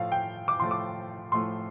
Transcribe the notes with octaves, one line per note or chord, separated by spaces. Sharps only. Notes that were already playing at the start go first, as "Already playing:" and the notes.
Already playing: A2 F3 A3 F5
G5
D6
A2 F3 A3 C6
D6
A2 F3 A3 C6